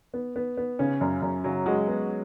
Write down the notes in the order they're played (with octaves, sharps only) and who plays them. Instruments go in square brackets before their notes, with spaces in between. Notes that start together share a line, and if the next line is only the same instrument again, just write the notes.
[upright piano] B3
B3
B3
[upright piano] C#3 [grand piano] C#4
[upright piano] F#2
F#2
[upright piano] C#3 [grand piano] F#3
[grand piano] G#3 [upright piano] F#4
[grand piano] G#3 [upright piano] B3